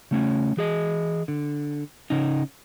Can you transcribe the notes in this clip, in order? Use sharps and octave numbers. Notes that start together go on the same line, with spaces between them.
C#3 A3 C#4
E3 G#4 D#5
D3
C#3 C#4 D#4